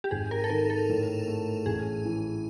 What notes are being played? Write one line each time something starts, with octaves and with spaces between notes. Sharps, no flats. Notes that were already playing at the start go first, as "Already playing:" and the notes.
G4
G#1 G#4
A#4
A4
D#3 A#4
A4
A2
A3
A1 G#4
E3